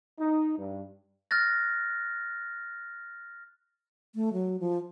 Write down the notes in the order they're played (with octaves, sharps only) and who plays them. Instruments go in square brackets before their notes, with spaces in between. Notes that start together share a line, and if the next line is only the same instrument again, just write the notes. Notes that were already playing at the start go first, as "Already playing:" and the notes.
[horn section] D#4
G2
[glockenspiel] F6 F#6 A6 A#6
[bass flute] A3
F#3
F3